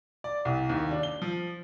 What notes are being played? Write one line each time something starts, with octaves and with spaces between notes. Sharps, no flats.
D5
C2
D#2
D4
G7
F3